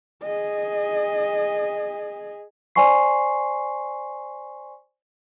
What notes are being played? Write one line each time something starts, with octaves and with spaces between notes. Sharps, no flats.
G#4 D#5
C5 D5 G#5 C6 C#6 C7